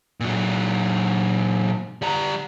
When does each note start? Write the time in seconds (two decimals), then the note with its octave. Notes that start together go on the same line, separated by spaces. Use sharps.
0.20 A#2 F#3
2.02 G3 A#5